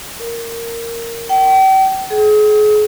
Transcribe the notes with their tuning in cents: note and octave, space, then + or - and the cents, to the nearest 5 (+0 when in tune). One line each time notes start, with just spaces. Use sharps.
A#4 -10
G5 -40
G#4 +35